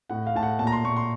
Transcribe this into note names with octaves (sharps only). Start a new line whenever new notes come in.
A2 F#5
F5
A2 A5
F#5
A#2 A5
A#5
C6
A#2 C#6
C6